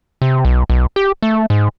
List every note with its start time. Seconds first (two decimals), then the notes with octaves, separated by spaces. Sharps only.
0.22 C3
0.45 B1
0.70 B1
0.96 G4
1.22 A3
1.50 G#2